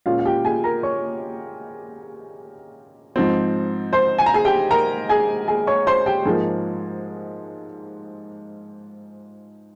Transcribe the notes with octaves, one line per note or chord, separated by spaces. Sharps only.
A#2 G#3 C#4 F4 F5
F5
G4 G5
G#4 G#5
A#4 A#5
C#5 C#6
G#2 F3 C4
C5 C6
G#5
A#5
G#4 G#5
G4 G5
A#4 A#5
G#4 G#5
G#4 G#5
C#5 C#6
C5 C6
G4 G5
G#2 F3 G#3 A#3 G#4